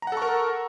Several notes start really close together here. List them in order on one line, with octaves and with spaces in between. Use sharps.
A#5 F#5 A4 C#6 A#4